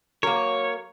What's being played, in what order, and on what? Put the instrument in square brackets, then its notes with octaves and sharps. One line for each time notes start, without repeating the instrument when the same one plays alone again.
[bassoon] F#3 [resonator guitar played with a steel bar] A#3 A#4 [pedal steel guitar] C#5